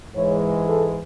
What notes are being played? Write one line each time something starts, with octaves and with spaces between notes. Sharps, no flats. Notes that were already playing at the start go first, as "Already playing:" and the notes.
G#2 E3 G#3 C#5
A4